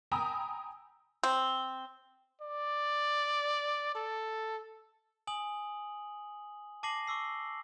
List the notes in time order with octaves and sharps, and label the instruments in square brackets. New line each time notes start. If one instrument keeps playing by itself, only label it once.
[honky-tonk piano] G5 G#5 A#5 B5 D#6 E6
[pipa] C4
[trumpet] D5
A4
[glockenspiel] G#5 D#6 F#7
A5 D6 A#6 C7 F#7
C#6 D6 E6 C7